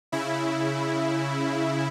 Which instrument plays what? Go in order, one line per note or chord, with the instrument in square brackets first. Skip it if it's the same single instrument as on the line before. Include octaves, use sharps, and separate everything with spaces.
[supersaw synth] C#3 E4